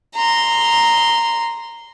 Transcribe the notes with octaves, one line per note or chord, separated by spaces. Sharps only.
A#5 C6